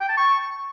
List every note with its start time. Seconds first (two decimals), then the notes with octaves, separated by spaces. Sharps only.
0.01 G5
0.09 A5
0.17 C#6